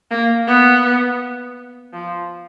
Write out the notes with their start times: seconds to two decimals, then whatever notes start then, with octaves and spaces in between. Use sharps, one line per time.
0.11 A#3
0.47 B3
1.93 F3